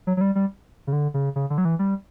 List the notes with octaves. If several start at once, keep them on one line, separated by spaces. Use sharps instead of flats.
F#3
F#3
G3
G3
C#3
D3
C#3
C#3
D3
F#3
E3
G3